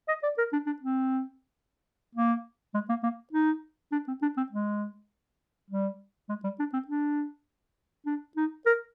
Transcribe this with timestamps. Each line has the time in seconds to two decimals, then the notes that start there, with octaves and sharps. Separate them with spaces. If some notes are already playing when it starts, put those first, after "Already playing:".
0.08 D#5
0.23 D5
0.38 A#4
0.53 D4
0.66 D4
0.82 C4
2.15 A#3
2.74 G#3
2.89 A#3
3.03 A#3
3.33 D#4
3.92 D4
4.08 C4
4.22 D4
4.37 C4
4.52 G#3
5.70 G3
6.29 G#3
6.44 G3
6.59 D4
6.73 C4
6.88 D4
8.06 D4
8.36 D#4
8.66 A#4